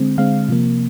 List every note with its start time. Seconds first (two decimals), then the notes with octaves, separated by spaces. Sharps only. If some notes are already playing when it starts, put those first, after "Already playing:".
Already playing: D3 G#3 C4
0.18 D3 G#3 C4 F5
0.49 C3 F3 A#3